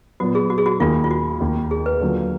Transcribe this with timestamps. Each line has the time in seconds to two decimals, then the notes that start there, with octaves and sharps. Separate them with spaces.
0.20 A#2 F#3 B3 F#4
0.35 G#4
0.50 F#4
0.58 G#4
0.66 F#4
0.80 D#2 D#3 A#3 D#4 F4 G#4
1.04 F4
1.11 F#4
1.41 D#2 D#3 A#3
1.71 G#4
1.86 B4
2.01 D3 F#3 A#3 F4